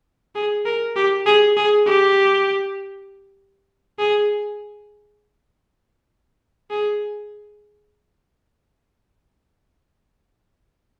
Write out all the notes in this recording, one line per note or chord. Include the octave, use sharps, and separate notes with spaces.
G#4
A#4
G4
G#4
G#4
G4
G#4
G#4